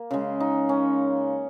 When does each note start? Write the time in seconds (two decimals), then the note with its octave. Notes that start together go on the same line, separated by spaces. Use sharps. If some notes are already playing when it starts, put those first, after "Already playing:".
Already playing: A#3
0.11 C#3 G#3
0.40 D#4
0.69 C#4